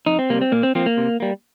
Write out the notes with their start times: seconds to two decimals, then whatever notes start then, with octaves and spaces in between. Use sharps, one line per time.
0.06 F2 D#4
0.19 C4
0.30 C3 G3 A#3
0.41 C4
0.52 A#2 A#3
0.63 C4
0.75 F3 A#3 C4
0.86 A#3
0.97 C3
1.20 G3 A#3